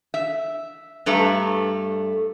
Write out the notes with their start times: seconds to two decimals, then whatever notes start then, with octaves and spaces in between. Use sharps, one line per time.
0.14 E5
1.06 G2 A3 A4 B4 A5 A#5